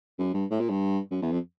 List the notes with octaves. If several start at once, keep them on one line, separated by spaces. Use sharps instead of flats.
F#2
G2
A2
A#2
G2
F#2
E2
F2